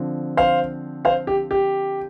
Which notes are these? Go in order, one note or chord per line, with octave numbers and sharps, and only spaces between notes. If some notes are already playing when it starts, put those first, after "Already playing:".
Already playing: D3 F3 C4
C5 F5
C5 F5
G4
G4